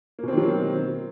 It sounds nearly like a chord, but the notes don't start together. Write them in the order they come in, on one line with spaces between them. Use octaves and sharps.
A#3 B2 C4 D#3 F#3